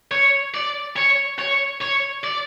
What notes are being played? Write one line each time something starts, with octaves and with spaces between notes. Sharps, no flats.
C#5
D5
C#5
C#5
C#5
D5